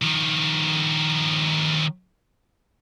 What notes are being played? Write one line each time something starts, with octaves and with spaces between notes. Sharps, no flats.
D#3 F3